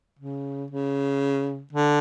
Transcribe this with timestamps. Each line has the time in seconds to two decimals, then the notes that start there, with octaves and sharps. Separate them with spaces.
0.19 C#3
0.71 C#3
1.73 D3